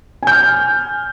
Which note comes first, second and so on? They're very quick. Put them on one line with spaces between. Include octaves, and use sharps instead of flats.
G#5 G6 F6